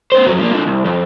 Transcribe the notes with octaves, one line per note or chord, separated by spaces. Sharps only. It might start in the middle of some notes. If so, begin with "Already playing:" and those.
B3 C5
F2 F#3
F3 A#3
D3 F3
C2
F2